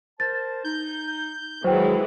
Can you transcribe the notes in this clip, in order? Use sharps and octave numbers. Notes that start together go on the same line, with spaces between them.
A#4 C5 A5 A6
D#4 G6
D#3 E3 F#3 G#3 C5 G5